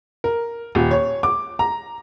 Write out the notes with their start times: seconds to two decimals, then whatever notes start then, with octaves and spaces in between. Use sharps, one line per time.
0.24 A#4
0.75 D#1
0.91 C#5
1.23 D6
1.59 A#5